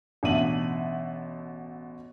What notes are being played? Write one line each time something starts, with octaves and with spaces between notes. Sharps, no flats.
A1 B2 D4 E5 D#7 F#7